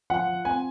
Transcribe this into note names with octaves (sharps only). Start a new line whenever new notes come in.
F3 F#5
F3
C4 G#5